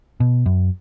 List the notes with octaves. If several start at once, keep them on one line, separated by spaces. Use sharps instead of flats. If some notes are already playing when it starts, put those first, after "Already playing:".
B2
F#2